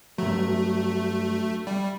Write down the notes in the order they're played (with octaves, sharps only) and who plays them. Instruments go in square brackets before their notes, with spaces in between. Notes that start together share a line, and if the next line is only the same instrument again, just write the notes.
[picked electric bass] G2 F#3 [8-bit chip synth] A3
[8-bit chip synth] G3